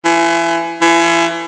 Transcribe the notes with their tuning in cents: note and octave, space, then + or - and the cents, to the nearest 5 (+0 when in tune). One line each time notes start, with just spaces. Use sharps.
E3 +30
E3 +35